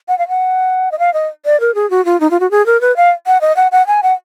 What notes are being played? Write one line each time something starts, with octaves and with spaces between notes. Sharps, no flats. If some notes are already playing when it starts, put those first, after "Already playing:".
F#5
F5
F#5
D#5
F5
D#5
D5
A#4
G#4
F#4
F4
D#4
F4
F#4
G#4
A#4
B4
F5
F#5
D#5
F#5
F#5
G#5
F#5